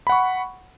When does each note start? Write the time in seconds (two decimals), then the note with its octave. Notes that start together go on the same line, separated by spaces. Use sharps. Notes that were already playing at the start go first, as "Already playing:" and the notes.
0.07 B5
0.09 F#5
0.12 C#6